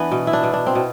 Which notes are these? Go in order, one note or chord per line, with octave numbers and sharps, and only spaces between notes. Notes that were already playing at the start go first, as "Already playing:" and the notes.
Already playing: E3 B3 D4
B2
E4
D4
B2
D4
C4
B2